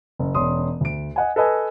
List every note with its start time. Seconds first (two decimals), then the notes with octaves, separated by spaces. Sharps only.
0.19 F#1
0.35 E1 C#4 C6 D#6
0.81 D2 D7
1.16 D#5 F#5 G#5
1.36 A4 B4 D#5 G#5